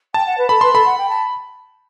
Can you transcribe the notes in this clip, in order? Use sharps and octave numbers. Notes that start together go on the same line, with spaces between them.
G5 A5
F#5
B4
A4 B5
B4 C6
A4 B5
F#5
G5
A5